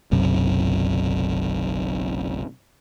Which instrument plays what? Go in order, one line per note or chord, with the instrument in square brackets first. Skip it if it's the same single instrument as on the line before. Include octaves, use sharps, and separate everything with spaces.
[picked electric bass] F#1 B1 F#2 C3